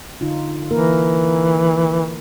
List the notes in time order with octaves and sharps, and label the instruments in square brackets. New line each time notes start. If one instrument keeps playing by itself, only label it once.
[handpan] D3 D#4 F4
[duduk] E3 [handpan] A#3 A#4